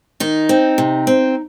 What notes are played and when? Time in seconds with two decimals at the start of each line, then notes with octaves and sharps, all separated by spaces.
0.20 D#3 D#4
0.49 C4
0.78 C3
1.07 C4